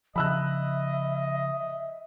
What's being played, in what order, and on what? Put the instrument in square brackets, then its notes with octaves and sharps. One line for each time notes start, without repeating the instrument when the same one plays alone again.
[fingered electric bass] C#3 F3 [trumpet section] D#5 [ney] E5 [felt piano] B5 E6 F#6